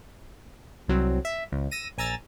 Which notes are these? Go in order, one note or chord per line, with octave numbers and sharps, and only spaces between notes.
C2 F#3 C4
E5
C#2
E6 A#6 D#7
A#1 G#5 A#5 E6 A6